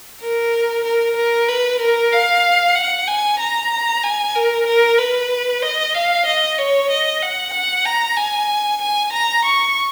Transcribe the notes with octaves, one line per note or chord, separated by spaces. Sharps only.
A#4
A#4
A#4
B4
A#4
F5
F#5
G#5
A#5
G#5
A#4
A#4
B4
D#5
F5
D#5
C#5
D#5
F#5
F#5
A#5
G#5
G#5
A#5
C#6